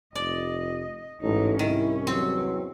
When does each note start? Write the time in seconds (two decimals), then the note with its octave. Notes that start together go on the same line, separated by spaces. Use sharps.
0.15 F1 D5 D#5
1.22 A1 G#2 D#4 E4 A4 C#5
1.59 C2 D#3 C#4 E4
2.07 E2 F#3 C4